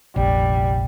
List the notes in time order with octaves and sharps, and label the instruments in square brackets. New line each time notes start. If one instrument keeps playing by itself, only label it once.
[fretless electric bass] F1 A#1 [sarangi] G3